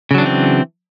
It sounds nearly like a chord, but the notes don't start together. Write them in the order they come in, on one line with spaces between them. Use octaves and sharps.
C#3 F#3 D4 E3 C4